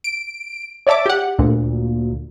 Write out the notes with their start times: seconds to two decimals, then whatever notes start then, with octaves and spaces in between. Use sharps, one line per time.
0.04 D7
0.87 C#5 D5 E5 A5 D6
1.06 G4 F#5
1.39 D2 A#2